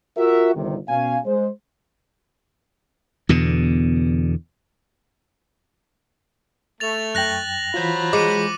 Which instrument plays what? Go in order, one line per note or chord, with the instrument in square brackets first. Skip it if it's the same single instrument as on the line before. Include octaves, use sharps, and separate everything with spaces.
[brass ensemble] F4 F#4 A#4 E5
G1 C3 D#3
B2 C#4 F5 G#5
G#3 C5
[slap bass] E2 B2 D3
[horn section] A3 [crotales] A6 F7
[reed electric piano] F#2 G5 [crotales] F#6 A#6 F#7
[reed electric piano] E3 F4 [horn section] F#3 C5 B5
[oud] G#3 [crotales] D6 C#7 D#7